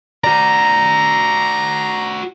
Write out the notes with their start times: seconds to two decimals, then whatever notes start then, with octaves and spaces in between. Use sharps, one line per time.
0.24 F#4 D5 A#5